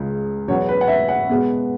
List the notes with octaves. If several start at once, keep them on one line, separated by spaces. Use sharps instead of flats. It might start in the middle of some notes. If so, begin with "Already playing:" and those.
Already playing: C#2 C#3 G#3
E2 B2 F#3 B3 C#5
B4
F#5
E5
F#5
B2 G#3 B3